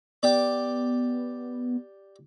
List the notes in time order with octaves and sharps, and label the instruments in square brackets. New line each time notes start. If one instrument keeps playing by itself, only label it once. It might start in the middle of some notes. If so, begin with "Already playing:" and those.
[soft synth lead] B3 [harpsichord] G4 D5